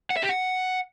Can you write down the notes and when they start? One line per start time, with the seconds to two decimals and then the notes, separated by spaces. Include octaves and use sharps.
0.10 F#5
0.17 E5
0.23 G4
0.29 F#5